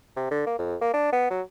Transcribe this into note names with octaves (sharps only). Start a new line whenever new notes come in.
C3
D3
A#3
F2
A#3
D4
B3
F#3